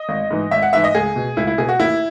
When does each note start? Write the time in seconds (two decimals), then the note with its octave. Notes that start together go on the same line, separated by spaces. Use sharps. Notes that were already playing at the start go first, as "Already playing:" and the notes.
Already playing: D#5
0.09 G#1
0.31 G#2 E3
0.51 G#1 E5
0.62 F#5
0.73 G#2 E3 E5
0.84 D#5
0.95 C#2 G#4
1.16 B2
1.37 C#2 E4
1.47 E4
1.58 B2 G#4
1.69 F#4
1.79 D#2 E4